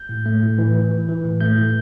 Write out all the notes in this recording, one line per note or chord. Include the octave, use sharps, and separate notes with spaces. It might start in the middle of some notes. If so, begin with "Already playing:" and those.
Already playing: G6
A2
A3
A2
E3
E3
E3
E3
A2
A3 G6
A2